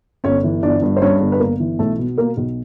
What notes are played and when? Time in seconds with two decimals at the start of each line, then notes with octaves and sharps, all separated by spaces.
0.24 G1 C#4 C#5
0.44 E3
0.63 G1 D4 D5
0.82 G2
0.96 C5
1.02 G2 C#4 C#5
1.21 G1
1.32 B4
1.40 G1 A#3 A#4
1.60 E3
1.79 B1 A3 A4
1.99 B2
2.18 B2 A#3 A#4
2.37 B1